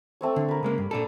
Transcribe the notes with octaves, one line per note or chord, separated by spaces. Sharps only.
A3 C4 C#5
D3
A#4 B4
C#3 G#3 A#3
G2
A#2 D4 A4